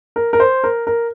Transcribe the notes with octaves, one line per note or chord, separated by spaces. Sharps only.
A#4
A#4
C5
A#4
A#4